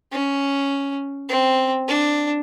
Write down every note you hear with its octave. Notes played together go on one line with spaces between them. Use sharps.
C#4
C4
D4